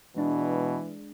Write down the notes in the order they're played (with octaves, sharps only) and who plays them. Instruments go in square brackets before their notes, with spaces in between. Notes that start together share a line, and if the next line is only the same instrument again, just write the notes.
[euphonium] B2 [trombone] E3 [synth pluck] G#3 D4